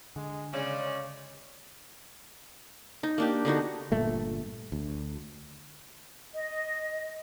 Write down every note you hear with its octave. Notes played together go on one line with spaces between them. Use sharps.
D3 G#3
C#3 G#3 C#4 D5
D#4
A#3 D4 G4
D3 B3 D#4 F#4
G1 G2 A#2 A3
D2
D#5